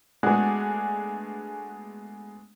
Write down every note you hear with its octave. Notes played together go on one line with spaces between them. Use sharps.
G#3 A3 B3 D4 F#4 G#4